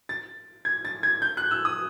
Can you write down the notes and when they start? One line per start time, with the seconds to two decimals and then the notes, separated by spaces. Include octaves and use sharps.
0.09 A6
0.65 G#6
0.85 A6
1.03 G#6
1.22 G6
1.37 F#6
1.51 E6
1.65 D#6